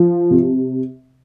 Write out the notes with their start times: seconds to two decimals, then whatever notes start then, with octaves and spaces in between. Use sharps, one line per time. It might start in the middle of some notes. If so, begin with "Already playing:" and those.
Already playing: F3
0.31 C3